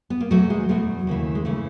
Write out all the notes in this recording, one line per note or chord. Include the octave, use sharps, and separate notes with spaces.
B3
A#3
E2 B2 F#3 A3
G#3
E2 B2 F#3 A3
D#2 C#3 E3
G#3
C#3 E3 A3